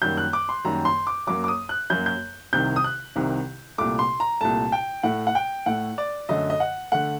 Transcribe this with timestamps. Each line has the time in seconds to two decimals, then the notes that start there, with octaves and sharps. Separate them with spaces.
0.02 F#2 D#3 G3 A#3 G6
0.17 F#6
0.33 D6
0.49 C6
0.65 F#2 D#3 G3 A#3 A#5
0.85 C6
1.07 D6
1.27 F#2 F#3 A#3 D6
1.44 D6
1.48 D#6
1.69 F#6
1.90 F#2 F#3 A#3 G6
2.06 G6
2.53 C2 C3 D#3 G6
2.76 D#6
2.84 F#6
3.16 C2 C3 D#3
3.78 C2 A#2 A3 D6
3.99 C6
4.20 A#5
4.41 C2 A#2 A3 A5
4.72 G5
5.03 A2 A3 F#5
5.27 F#5
5.35 G5
5.66 A2 A3 F#5
5.98 D5
6.29 F#2 D3 A3 D#5
6.50 D#5
6.60 F#5
6.92 D3 A3 F#5